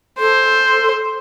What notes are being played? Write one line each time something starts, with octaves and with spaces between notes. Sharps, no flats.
A4 C5